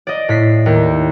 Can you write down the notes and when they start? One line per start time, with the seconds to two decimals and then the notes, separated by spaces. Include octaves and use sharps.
0.07 D5 D#5
0.29 A2 B6 C7
0.66 D#2